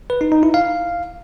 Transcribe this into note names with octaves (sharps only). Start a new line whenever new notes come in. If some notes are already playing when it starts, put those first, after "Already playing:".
B4
D#4
D#4
E4
F5